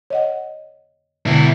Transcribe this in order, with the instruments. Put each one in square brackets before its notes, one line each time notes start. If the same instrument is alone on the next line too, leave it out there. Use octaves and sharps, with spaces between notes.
[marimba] C#5 D#5 F#5
[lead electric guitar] B2 E4 [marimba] D3